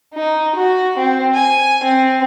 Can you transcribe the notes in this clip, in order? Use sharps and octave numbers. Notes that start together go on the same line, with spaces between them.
D#4
F#4
C4
G#5
C4